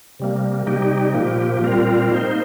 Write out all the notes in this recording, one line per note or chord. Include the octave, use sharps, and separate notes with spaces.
C3 G3 A#3
C3 G3 D#4 G4
A#2 F3 A#3 G4
A#2 G3 C4 F4 A#4
A#3 D#4 C5